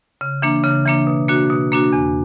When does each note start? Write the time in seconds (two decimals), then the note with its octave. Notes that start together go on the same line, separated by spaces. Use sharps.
0.21 C#3
0.42 E3 A#3 D4
0.64 C#3
0.86 E3 A#3 D4
1.07 B2
1.28 A#3 D4 F#4
1.50 B2
1.72 A#3 D4 F#4
1.93 E2